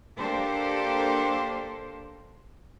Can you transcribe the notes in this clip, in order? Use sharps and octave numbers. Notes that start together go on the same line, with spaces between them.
A#3 D4 G4 A4 A#4 C5